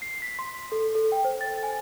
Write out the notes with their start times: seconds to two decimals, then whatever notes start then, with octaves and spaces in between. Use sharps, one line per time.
0.02 C7
0.22 B6
0.39 C6
0.72 A4
0.95 A4
1.12 G5
1.25 C5
1.41 A6
1.63 G#5